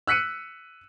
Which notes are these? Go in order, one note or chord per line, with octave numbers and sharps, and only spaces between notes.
E6 F#6 B6 C#7 D#7